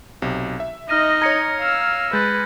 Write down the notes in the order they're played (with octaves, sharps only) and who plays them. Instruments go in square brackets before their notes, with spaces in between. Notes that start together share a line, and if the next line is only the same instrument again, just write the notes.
[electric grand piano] B1 C3
E5
[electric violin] D#4 D#5 [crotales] F6 A#6 D#7
[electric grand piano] C#5 A#5 [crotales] G#6 A#6 C#7
[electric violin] F5 E6
[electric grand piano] G#3 [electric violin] B4 [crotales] G6 A6